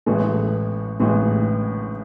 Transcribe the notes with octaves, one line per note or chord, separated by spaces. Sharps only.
A1 A2 E3 G#3 A4
A1 A2 E3 G#3